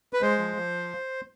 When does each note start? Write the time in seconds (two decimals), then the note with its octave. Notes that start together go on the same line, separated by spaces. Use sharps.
0.13 B4
0.22 G#3 C5
0.39 F3
0.57 F3